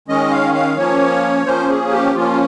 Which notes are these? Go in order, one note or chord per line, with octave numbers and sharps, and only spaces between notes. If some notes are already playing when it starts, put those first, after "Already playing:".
D#3 G#3 C#4 D#5
F5
F5
F3 A#3 C#4 C#5
F3 A#3 C#4 C5
G#4
G4
F3 A#3 C#4 F4